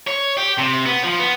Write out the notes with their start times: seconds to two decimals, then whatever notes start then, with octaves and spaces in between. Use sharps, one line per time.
0.07 C#5
0.37 G4
0.58 C3
0.86 B3
1.03 F3
1.19 B3